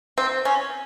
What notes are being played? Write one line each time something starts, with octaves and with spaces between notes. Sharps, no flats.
C4
C#4